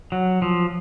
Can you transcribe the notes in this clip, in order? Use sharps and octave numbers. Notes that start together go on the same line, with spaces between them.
F#3
F3